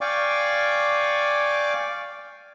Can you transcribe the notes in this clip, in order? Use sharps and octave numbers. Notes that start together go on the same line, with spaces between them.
D5 F5 G5 G#5 C#6 D6